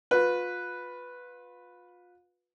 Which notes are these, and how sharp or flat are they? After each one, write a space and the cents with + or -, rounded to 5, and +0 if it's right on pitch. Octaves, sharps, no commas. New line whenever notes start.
F4 +35 B4 +0